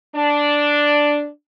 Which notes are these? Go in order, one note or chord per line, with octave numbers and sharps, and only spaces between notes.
D4